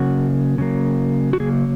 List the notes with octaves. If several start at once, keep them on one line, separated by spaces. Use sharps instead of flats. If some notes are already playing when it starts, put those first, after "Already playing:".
Already playing: C#3 F#3 A#3 F#4
C#3 F#3 A#3
F#4
C#3 F#3 A#3 G#4